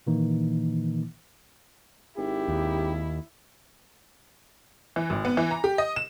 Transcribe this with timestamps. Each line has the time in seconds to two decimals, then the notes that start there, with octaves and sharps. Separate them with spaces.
0.07 A#2 D#3 E3 A#3 D#4
2.17 G#1 E4 G4
2.48 D#2
4.96 E3
5.10 G#1
5.25 B3
5.37 E3
5.51 A#5
5.64 G4
5.78 D#5
5.96 E7